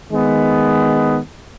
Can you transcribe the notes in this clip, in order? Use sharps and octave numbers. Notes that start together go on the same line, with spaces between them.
D#3 G#3 B3